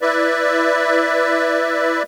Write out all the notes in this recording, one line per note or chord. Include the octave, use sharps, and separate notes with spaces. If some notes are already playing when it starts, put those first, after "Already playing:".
E4 B4 D5 E5